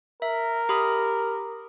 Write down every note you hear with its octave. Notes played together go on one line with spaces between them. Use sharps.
A#4 E5
G4 B5 D#6